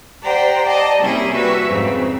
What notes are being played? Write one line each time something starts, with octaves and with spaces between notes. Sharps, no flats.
G4 C5 D5 F#5 G5 A#5
D5 D#5 A5
C3 G3 A#3 C#4 E4 G#4
F#4 B4 E5
F2 G#2 C#3 C4